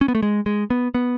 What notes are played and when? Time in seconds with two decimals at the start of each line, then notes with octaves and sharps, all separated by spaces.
0.01 C#4
0.08 B3
0.15 A3
0.22 G#3
0.46 G#3
0.70 B3
0.94 B3